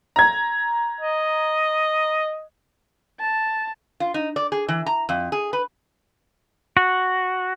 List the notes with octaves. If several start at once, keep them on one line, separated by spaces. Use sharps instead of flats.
A#5 G#6
D#5
A5
F4
D#4
D5
G#4
E3
A#5
F2
G#4
B4
F#4